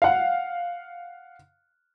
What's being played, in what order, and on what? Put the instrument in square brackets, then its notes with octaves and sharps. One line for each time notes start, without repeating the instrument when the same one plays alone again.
[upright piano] F5 F#5